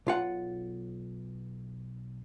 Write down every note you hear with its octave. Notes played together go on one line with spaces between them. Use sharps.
B1 F4 F#5